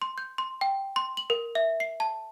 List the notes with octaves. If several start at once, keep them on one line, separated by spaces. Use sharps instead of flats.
C6
G6
C6
G5
C6
F#7
A#4
E5
C7
A5